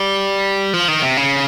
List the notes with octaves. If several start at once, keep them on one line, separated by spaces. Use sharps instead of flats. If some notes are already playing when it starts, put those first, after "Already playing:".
Already playing: G3
F3
D#3
C3
C#3